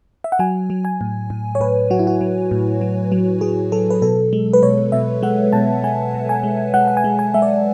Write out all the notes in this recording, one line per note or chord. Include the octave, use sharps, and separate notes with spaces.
E5
F#5
F#3 G#5
F#3
G#5
A2
A2
C#5
A2 B4
F#3 F#4
E4
F#4
F#3
A2
F#3
F#3
F#3 G#4
F#3 A4
B4
B2 A4
G#3
B4
B2 C#5
B2 E5
G#3 F#5
B2 A5
G#3 G#5
B2
G#5
G#3
G#3 F#5
F#5
G#5
G#3
G#5
G#3 E5
D5